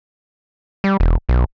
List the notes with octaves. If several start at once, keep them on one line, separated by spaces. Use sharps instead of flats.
G3
E1
B1